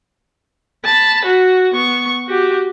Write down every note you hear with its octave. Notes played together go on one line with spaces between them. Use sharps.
A5 B5
F#4
B3 C#6
F#4 G4